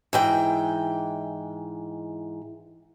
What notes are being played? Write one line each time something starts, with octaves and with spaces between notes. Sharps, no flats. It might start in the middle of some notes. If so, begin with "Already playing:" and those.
G#2 E3 G5